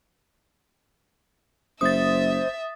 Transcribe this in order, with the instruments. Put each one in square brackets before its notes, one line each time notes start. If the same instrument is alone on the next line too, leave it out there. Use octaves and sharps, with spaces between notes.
[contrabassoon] F#1 [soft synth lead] C5 [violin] E5 [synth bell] D#6 A6